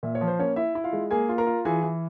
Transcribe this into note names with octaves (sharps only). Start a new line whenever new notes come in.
A#2 E5
C#5
F3
C5
A#3 C#4 C#5
E4 E5
E4
F4 F5
G#3
A#3 G#4 G#5
F4
A#4 A#5
F4
E3 G#4 G#5
E3